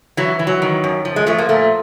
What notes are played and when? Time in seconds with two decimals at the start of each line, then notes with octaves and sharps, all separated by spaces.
0.17 E3 F#3
0.39 E3
0.47 F#3
0.62 D#3
0.84 F#2
1.05 F3
1.16 G#3
1.27 F3 A3
1.38 A#3
1.49 A#2 A3